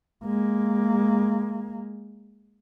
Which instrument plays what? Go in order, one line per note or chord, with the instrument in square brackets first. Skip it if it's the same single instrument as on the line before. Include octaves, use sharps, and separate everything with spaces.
[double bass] G#3 A#3